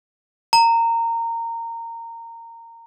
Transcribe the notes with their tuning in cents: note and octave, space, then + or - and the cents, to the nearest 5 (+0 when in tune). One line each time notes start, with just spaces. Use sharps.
A#5 -20